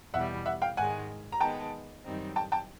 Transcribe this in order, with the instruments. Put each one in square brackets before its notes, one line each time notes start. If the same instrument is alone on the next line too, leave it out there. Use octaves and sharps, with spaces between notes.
[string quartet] E2 B2 G3 [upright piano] E5 F#5
[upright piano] E5 F#5
F5 G5
[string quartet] G#2 D#3 G#3 [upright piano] F#5 G#5
[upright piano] A#5
[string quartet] D#3 G#3 B3 [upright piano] G5 A5
[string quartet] F#2 D#3 G3 C4 D#4
[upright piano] G5 A5
G5 A5